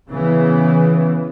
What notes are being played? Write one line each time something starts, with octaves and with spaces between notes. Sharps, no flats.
C#3 E3 B3